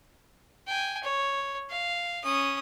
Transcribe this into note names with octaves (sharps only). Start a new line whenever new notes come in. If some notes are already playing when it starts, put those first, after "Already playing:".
G5 G#5
C#5
F5
C#4 D#6